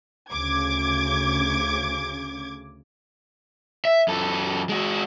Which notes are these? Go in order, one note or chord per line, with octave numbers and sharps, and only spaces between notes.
D2 C#3 D6 G#6
E5
F#2 A4
G#3 F#4